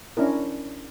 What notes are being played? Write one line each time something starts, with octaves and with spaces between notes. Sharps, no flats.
C#4 D4 E4 A#4